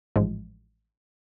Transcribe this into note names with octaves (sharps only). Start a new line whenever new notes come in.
A1 G#2 F3 G#3